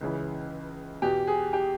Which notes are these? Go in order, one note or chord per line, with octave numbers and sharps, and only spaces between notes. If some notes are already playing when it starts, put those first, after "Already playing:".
C#2 C#3 E3
E2 B2 G4
G#4
G4